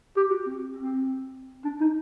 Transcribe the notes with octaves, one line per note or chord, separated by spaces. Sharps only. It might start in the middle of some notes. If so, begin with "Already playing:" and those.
G4
F#4
C4
C4
D4
D#4